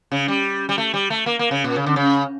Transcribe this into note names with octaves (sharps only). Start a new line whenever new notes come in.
C#3
G3
G3
A3
G3
A3
A#3
A#3
C#3
A#2
C#3
D3
C#3